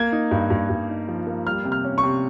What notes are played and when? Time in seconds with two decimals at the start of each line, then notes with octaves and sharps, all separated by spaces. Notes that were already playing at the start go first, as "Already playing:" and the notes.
Already playing: A#3 G#6
0.12 D#4
0.31 G2
0.50 G2
0.69 G2
0.89 D#4
1.08 F3
1.27 A#3
1.46 G3 F6
1.65 C3
1.72 F6
1.85 C#4
1.98 C#6
2.03 C3